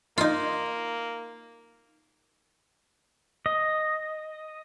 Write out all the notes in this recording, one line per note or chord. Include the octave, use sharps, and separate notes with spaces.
A#3 D#4 F4
D#5